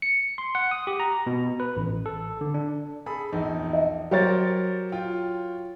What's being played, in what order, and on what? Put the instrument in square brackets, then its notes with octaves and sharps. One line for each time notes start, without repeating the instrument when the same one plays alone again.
[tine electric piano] C#7
C6
F#5
D#6
G4
A#5
B2
B4
A1
A4
D3
D4
[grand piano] G#4 A4 B5
A#1 E2 D#4
[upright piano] D#5
[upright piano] F#3 C#5 A6 [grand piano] G4 A#4 C5
[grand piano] F4 G5